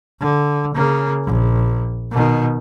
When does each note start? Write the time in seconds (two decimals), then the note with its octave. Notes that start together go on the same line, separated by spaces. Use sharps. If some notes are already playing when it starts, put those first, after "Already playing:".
0.19 D3
0.74 C#3 A#3
1.25 A#1
2.11 B2 D#3